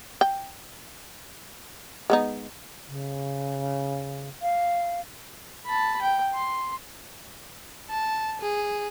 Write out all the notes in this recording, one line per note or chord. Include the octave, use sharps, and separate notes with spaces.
G5
G#3 B3 D#4
C#3
F5
A5 B5
G5
C6
A5
G#4